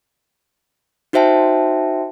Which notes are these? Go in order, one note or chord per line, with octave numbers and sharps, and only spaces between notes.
D#4 F#4 C5 E5 G5 A5